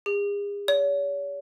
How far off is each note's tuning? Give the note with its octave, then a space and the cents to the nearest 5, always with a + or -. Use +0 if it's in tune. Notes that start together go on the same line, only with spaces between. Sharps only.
G#4 -40
C#5 +40